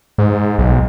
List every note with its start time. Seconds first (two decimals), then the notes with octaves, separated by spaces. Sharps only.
0.18 G#2
0.58 B1